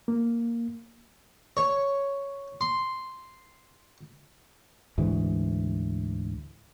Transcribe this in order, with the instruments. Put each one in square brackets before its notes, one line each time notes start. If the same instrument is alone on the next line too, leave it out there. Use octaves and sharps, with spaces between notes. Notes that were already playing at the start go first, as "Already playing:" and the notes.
[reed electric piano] A#3
[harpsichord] C#5
C6
[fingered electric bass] D2 G#2 E3